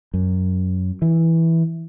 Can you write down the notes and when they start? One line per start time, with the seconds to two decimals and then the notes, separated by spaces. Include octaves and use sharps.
0.14 F#2
1.02 E3